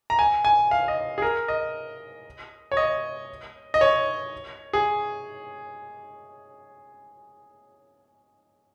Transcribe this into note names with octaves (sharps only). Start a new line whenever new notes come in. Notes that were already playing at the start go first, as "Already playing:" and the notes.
A#5
G#5
G#5
F5
D#5
G#4
A#4
D#5
C#5
D#5
D#5
C#5
G#4